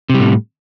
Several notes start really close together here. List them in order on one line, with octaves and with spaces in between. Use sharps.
C3 G3 A2